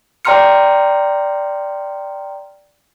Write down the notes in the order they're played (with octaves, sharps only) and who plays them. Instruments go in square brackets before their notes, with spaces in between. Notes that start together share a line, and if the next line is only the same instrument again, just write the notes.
[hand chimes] D5 G5 A#5 C6 F6 C#7